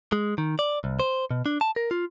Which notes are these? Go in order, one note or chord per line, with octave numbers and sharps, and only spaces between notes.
G#3
D#3
D5
C2
C5
B2
D4
A5
A#4
F4